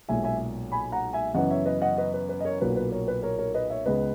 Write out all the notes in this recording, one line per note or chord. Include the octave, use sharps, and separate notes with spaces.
B1 A#2 G#3 E5 G#5
E5 G#5
G#5 B5
F#5 A#5
E5 G#5
F#2 C#3 E3 B3 D#5 F#5
C#5 E5
B4 D#5
D#5 F#5
B4 D#5
B4
B4
D#5
A#4 C#5
B1 A#2 F#3 A#3 B4
B4
A#4 C#5
B4
A#4 C#5
A#4 C#5
B4 D#5
C#5 E5
C#2 C#3 G#3 B3 B4 D#5